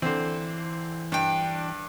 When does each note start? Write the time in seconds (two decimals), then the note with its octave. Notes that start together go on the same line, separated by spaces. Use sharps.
0.02 D3 E3 C4 C5
1.12 G2 D4 G5